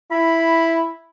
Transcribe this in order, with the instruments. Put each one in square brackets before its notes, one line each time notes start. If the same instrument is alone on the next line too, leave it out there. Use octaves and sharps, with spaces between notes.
[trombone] E4 [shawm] B5